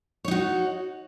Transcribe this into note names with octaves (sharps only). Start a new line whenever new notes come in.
D#4 F#4 C#5